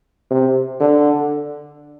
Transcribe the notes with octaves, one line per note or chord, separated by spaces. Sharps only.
C3
D3